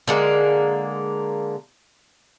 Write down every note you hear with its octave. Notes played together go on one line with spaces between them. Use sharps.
D3 G#3 A#3